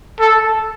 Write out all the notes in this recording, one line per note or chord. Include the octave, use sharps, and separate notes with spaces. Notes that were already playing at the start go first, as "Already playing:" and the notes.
A4